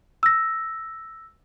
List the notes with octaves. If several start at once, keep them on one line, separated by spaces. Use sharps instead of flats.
E6 A#6